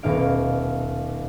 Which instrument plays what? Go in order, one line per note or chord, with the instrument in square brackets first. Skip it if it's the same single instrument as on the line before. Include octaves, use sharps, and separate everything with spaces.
[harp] D#1 B2 D#4 F5 D7